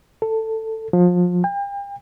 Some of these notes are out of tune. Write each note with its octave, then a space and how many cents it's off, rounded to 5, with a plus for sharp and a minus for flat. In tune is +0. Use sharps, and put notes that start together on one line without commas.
A4 +10
F3 +30
G5 +40